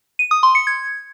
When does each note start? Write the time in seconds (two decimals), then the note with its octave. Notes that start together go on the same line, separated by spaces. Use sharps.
0.19 D#7
0.31 D#6
0.43 C6
0.55 C#7
0.67 G#6